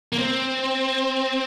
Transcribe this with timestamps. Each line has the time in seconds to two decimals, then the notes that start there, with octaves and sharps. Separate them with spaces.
0.12 A#3
0.18 C4